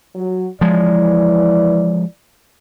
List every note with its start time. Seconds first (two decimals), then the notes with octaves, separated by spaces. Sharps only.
0.15 F#3
0.61 E3 F3 G#3 D5